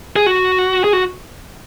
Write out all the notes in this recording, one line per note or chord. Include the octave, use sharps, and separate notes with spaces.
G#4
F#4
G#4
F#4